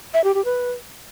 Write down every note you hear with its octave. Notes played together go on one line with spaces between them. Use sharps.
E5
G4
G4
B4